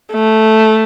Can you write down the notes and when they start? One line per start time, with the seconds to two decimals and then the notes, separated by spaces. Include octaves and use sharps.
0.12 A3